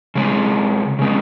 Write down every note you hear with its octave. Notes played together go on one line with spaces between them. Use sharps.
C#3 G#3 C4
C#3 G#3 C4